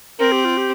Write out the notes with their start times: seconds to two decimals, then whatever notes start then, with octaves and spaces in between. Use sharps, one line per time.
0.19 C4 A#4
0.32 G4
0.45 F4
0.57 G4